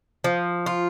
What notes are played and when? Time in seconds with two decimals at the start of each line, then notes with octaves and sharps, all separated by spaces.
0.24 F3
0.66 F4